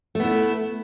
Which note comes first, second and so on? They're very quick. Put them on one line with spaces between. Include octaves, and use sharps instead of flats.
A3 B3 E4